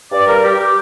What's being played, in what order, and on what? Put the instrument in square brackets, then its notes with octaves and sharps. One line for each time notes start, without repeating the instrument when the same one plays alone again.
[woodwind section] G2 D5
G3 A#4
G2 G4
G4